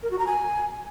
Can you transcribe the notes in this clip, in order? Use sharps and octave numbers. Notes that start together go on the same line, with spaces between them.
A#4
F#4
A#5
G#5